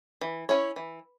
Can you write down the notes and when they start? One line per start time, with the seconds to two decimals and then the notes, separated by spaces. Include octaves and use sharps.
0.21 E3
0.49 C#4 E4 C#5
0.76 E3